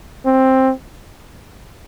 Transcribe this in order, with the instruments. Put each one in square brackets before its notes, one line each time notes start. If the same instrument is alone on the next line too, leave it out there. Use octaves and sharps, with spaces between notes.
[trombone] C4